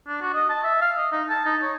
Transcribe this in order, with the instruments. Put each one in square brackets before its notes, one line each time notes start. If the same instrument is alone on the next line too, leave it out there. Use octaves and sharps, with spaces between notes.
[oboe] D4
F#4
D#5
A5
E5
F5
D#5
D#4
A5
D#4
C#5